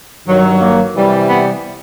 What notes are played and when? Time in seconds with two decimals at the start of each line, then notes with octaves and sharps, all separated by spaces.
0.25 G2 D#3 F#3
0.60 A#3
0.94 C3 E3 G3
1.29 B3